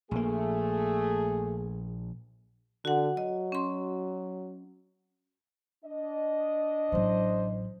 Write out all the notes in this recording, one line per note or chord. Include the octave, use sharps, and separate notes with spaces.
A#1 A3 A#3 G#4
D3 F#4 F#5
F#3 D#5
C#4 C6
D4 D#5
A1 F#3 C5